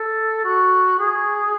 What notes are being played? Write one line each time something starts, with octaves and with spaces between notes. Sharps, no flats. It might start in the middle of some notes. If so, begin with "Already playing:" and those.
Already playing: A4
F#4
G#4